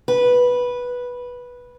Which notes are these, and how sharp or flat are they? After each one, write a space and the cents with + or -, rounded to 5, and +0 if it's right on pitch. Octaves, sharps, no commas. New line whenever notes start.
B4 -10